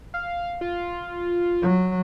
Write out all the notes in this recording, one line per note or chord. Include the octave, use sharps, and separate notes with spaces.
F5
F4
F#3